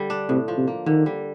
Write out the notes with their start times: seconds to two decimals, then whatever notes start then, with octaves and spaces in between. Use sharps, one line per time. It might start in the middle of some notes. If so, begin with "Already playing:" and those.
Already playing: D3 G3
0.10 D4
0.29 A2 C3
0.48 F3
0.57 C3
0.68 A#3
0.86 D3 D#3
1.06 G3